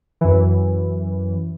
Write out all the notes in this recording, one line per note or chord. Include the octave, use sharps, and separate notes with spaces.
F#2 E3